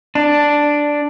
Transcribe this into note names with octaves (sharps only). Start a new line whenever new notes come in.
D4